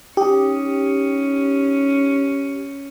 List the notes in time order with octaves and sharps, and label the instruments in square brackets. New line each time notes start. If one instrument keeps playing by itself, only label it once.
[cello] C#4 [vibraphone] D#4 [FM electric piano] G4